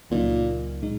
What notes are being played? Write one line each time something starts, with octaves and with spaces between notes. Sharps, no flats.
C#2 A#2 C#3 F#3 D#4
A#2 G#3 D#4